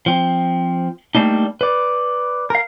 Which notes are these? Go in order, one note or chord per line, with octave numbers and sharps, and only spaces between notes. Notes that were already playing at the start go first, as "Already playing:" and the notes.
F3 C4
G3 A3 A#3 D4 D#4
B4 D5
A#4 F5